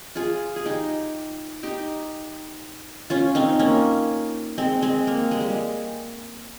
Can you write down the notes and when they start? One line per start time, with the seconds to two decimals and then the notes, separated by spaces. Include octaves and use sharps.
0.15 F4 G#4
0.56 G#4
0.66 D#4 G4
1.63 D#4 G4
3.10 C#4 F4
3.35 C4 D#4
3.59 A#3 C#4
4.58 G#3 C4
4.82 G#3 C4
5.07 A#3
5.31 G#3
5.41 G3
5.50 G#3